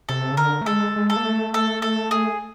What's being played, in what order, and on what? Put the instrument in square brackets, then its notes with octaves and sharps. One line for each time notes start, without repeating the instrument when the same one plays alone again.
[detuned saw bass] C3 [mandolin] A4
[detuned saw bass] C#3
[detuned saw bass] D3 [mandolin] A#4
[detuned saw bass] A3
[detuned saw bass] G#3 [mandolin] A4
[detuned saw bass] G#3
[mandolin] A4
[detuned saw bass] A#3
A3
[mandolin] A4
A4
G#4